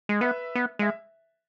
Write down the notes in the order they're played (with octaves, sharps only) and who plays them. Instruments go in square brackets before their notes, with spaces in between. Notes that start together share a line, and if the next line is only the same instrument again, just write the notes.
[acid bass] G#3
[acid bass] B3 [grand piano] B4 E5
[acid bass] B3
[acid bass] G#3 [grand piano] E5